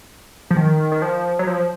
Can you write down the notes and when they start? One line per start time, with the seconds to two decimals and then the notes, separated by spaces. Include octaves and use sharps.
0.51 F3
0.57 D#3
0.92 D#3
1.02 F3
1.39 F#3
1.47 F3